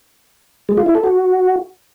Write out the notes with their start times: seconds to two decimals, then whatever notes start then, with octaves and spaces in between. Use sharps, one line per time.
0.69 G#3
0.77 F4
0.86 E4
0.95 A4
1.04 F#4